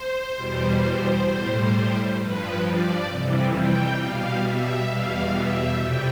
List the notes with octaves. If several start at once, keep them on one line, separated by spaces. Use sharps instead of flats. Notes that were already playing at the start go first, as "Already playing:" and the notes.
Already playing: C5
E2 B2 G3
A2 G3
G2 F3 B4
D5
F2 C3 E3 G3
G5
B2 G3 F5
E5
E2 B2 G3 F5
E5
F2 C3 G3 G5